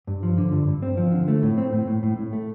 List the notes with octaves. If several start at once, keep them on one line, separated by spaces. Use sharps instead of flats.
G2
F3
D3
G2
G2
C4
F3
D3
A3
A2
C4
A2
A2
A2
A2
A3